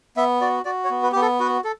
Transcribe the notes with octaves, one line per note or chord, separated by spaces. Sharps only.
B3 E5
F#4 D5
F#4 D5
C#5
B3
B4
B3 G4
A4
F#4 B4
A4